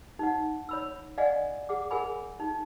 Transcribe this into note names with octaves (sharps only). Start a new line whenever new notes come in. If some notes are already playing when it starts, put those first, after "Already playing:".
D#4 F#5
C#5 B5 E6
D5 D#5 F5 F#5 G#5
G#4 F#5 D6
G#4 A#4 F#5 G#5 B5
D#4